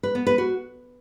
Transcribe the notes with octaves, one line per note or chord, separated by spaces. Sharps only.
B4
B3
B4
F#4